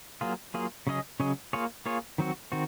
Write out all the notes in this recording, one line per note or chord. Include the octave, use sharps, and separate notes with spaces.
F#3 A#3 F4 G#4
F#3 A#3 F4 G#4
C#3 F#3 C#4 G#4 D#5
C#3 F#3 C#4 G#4 D#5
A#3 F4 G#4 C#5
A#3 F4 G#4 C#5
D#3 F#3 C4 F#4
D#3 C4 F#4